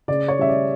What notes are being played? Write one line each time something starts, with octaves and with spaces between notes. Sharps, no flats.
C#3 D5
C#5
G3 C#4 E5
D5